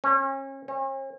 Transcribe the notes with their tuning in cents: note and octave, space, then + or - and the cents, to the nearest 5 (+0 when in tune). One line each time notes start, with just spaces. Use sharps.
C#4 -35
C#4 -45